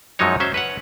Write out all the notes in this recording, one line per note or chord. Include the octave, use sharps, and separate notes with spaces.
F#2 F3 F#3 G#3 D#4 C#5
F#3 C#4 C5 E5
B4 C#5 F#5